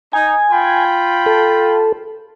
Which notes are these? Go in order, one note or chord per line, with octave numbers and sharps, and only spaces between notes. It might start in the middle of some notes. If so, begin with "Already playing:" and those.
D#4 G#5
F4 G5 B5
A4